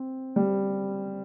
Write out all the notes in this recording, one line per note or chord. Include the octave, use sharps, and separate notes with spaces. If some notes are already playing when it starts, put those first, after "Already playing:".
Already playing: C4
G3